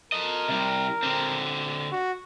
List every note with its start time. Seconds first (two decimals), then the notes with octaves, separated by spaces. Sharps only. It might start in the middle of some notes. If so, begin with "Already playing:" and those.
0.12 A4 A#4 D#5
0.48 C3 G3
1.03 D3 C4
1.92 F#4